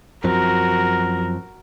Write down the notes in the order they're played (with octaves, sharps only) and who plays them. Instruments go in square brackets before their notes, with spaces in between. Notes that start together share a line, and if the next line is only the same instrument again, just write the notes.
[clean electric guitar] F#2 F3 C4 [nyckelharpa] F#4 A#4